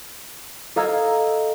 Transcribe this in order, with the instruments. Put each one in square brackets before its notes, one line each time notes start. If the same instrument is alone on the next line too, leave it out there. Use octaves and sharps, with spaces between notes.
[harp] A4 D#5 F5 A#5 E6 G#6